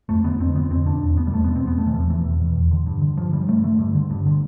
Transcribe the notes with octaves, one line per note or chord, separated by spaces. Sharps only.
F2 A3
D3 B3
F2 C4
D3 B3
F2 C4
B2 D4
E2
B2 B3
G3
E2 A3
B2 B3
C4
E2 B3
B2 A3
E3
E2 F3
B2 E3
E2
B2
E2
D3
G2
D3
G2 F3
D3 G3
G2 A3
D3 A3
G2
D3
G2
D3